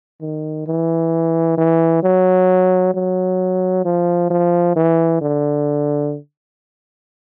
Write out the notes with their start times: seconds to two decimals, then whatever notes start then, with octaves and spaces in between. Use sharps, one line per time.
0.21 D#3
0.67 E3
1.58 E3
2.03 F#3
2.95 F#3
3.85 F3
4.30 F3
4.76 E3
5.22 D3